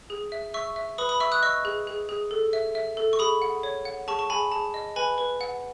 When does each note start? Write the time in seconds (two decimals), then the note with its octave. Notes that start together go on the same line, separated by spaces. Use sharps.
0.10 G#4
0.32 E5
0.54 E5 C#6 E6
0.76 E5
0.98 B4 B5 D#6
1.09 B5 D#6
1.20 E5 C#6 E6
1.32 D#6 F#6
1.42 D#5 C#6 E6
1.65 G#4
1.87 G#4
2.09 G#4
2.31 A4
2.53 E5
2.75 E5
2.97 A4
3.13 C#6
3.19 G#4 B5 D#6
3.42 F#5
3.63 C#5
3.85 F#5
4.08 G#4 A5 C#6
4.19 A5 C#6
4.30 G#4 G#5 B5
4.52 G#4 A5
4.74 D#5
4.96 B4 G#5 B5
5.18 B4
5.41 F#5